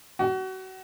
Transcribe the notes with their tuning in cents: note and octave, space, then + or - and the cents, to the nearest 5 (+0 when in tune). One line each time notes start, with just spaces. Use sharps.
F#4 +30